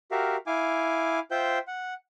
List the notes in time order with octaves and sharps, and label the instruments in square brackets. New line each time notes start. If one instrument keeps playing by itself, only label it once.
[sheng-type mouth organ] F#4 G4 A#4 E5 F5
E4 F5 G#5 D6
F4 C5 E5 G5 G6
F#5